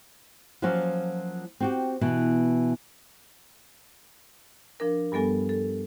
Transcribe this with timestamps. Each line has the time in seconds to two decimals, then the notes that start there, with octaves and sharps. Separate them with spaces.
0.62 F3 F#3 A#3 C#4 F4 F#4
1.60 C4 F#4 G4
2.01 B2 E3
4.80 F3 D4 A#4
5.12 G2 G3 B3 A4 G#5
5.49 A4